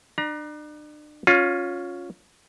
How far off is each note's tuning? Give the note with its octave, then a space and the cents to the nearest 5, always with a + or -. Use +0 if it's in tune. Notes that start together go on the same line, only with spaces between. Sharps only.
D4 +40 A#5 +25
C#4 +5 F4 +25